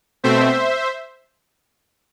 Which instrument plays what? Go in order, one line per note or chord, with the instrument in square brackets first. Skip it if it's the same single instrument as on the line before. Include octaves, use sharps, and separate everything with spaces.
[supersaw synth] B2 A3 C4 C5 E5